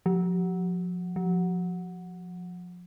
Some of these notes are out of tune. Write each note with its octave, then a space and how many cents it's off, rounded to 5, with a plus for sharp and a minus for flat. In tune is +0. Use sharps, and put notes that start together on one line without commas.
F3 +35
F3 +25